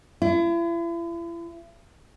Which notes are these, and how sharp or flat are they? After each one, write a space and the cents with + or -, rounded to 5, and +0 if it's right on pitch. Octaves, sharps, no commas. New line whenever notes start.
E4 +40